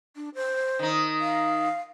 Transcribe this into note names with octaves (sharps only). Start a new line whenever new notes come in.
D4
C5
D#3 D#4
F5